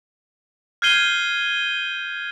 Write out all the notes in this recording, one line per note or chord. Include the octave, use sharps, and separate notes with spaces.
F6 G6 G#6 C7 D#7 G7